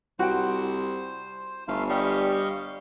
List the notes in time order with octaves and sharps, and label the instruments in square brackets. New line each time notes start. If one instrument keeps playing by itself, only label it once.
[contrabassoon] C2 [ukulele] F#4 G5 [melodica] C5
[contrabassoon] G1 [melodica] A3 F5 C6
[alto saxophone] G3 [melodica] D#5 F5 C#6